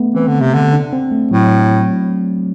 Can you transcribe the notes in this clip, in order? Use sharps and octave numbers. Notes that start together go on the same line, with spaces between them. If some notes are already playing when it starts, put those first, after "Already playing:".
Already playing: A3 B3
E3 C4
D3
C3
D3
D4
C4
A3
A2 F#3